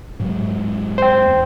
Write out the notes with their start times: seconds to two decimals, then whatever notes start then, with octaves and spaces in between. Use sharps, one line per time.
0.20 G#2 F#3 G#3
0.98 C5 G5
1.28 E2